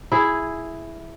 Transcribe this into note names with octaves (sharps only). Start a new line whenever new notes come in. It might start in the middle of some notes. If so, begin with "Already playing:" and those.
E4 G#4